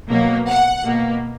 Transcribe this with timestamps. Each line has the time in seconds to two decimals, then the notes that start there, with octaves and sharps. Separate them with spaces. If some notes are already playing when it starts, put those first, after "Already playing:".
0.09 B2 F#3 A#3
0.47 F#5
0.85 B2 A#3